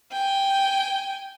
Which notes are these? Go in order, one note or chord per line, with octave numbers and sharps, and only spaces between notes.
G5 G#5